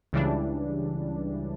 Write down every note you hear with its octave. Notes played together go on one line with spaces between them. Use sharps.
C#2 C#3 E3 G3 D4